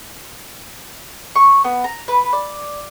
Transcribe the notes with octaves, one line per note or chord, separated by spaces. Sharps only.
C#6
B3
A#5
B4
D5